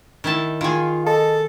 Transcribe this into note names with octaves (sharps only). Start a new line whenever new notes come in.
D#3 E4 A5
D#3 F4 G#4
A4 D#5